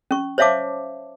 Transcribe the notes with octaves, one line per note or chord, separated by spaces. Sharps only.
C#4 C#6
C5 C#5 E5 F5 A5 D6